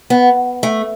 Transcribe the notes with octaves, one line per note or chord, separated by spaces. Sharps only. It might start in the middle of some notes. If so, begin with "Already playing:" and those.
B3
A3